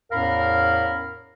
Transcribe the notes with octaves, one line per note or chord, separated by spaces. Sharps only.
E2 A2 C#4 A#4 F5 B5